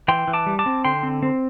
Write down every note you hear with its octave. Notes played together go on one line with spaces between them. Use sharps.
E3 G5 C6
E3
A5 D6
G3
A5 D6
C4
D3 G5 C6
C4
C4